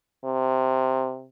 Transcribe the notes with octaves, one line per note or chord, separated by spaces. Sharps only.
C3